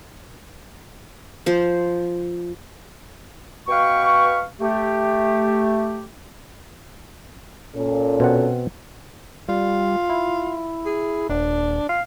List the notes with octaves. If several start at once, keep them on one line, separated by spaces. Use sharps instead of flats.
F3 C5
B2 B4 F5 G5 C#6
A3 G4
A#2 C#4 A4
B2 C4 F#5
G3 F4
E4
G#4
D#1 D4
F5